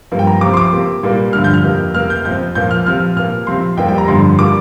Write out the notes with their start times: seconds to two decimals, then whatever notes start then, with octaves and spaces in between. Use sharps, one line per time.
0.12 G2 F3 A#3
0.19 G5
0.27 A#5
0.41 C3 F3 C4 D6
0.54 C6
0.57 D6
0.73 C3 A#3
1.03 A#2 G3 A#3
1.33 G2 D3 F3 F6
1.44 G6
1.54 F6
1.64 F2 C3 A#3
1.94 C3 A#3 F6
2.10 G6
2.25 F2 F3 C4 G6
2.55 A#2 F3 A#3 G6
2.71 F6
2.86 C3 F3 C4 F6
3.16 A#2 A#3 F6
3.47 C3 F3 C4 C6
3.77 F2 C3 G3 A#3 G5
3.88 G5
3.98 A#5
4.08 G2 D3 F3 C6
4.39 G3 A#3 D6